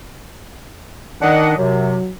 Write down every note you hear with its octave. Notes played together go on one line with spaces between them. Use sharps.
D#3 D4 D#5 F#5
F#2 C3 F#3